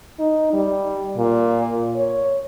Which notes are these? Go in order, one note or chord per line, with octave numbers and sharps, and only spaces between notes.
D#4
G3
A#2
C#5